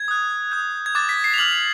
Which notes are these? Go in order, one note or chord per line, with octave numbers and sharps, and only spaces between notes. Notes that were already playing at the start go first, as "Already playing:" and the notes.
Already playing: G#6
D#6 F#6
D#6 G6
G#6
D6 F#6 A6
B6
C7
F7
D6 F6 F#7